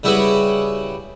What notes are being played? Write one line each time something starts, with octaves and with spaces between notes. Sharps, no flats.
C#3 G3 E4 F#4 G#4 B4